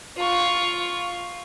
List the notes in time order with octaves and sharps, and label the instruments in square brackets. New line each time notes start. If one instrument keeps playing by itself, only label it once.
[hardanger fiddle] F4 C#6